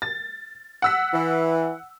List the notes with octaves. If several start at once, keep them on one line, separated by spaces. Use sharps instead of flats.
A6
F#5 E6 B6
E3